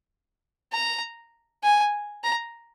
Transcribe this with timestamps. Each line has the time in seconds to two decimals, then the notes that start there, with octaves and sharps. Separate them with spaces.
0.72 A#5
1.64 G#5
2.24 A#5